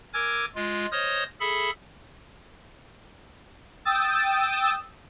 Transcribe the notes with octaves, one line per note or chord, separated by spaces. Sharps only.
A#4 G#5 D6 E6 G#6 A6
G#3 F4
C5 C#5 D#5 D#6 F6
G#4 A4 E5 B5
G5 D#6 E6 A6